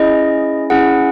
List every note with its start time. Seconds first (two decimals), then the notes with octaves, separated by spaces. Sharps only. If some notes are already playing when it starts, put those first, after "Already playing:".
Already playing: C#4 E4 G#4 D#5
0.70 C#4 E4 G#4 F#5